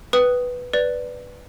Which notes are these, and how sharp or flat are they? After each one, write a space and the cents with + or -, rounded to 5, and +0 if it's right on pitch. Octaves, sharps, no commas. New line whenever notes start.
B4 +0 G5 -20 D#6 +0
B4 +0 D5 +0